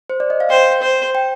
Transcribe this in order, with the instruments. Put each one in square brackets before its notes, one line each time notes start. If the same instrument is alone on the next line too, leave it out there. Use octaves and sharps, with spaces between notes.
[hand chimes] C5
D5
D#5
F5
[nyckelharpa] C5 [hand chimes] G5
[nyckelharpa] C5
[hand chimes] G5